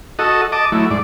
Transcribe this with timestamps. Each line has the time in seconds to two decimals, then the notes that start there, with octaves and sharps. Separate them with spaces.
0.19 F#4 A4 D#5
0.52 D#5 A5 D6
0.72 F#3 A3 E4
0.91 G#2 D5